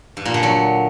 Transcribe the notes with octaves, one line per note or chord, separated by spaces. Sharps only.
G2
A#2
D3
F#3